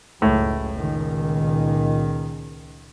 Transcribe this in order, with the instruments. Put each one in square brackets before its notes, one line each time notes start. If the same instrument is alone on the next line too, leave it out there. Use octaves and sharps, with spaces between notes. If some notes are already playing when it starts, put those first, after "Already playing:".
[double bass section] F#1 C#2 [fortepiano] A2
[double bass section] C#2 A#2 D#3